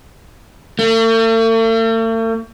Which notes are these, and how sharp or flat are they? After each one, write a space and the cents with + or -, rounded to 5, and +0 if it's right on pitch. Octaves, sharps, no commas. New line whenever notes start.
A3 +45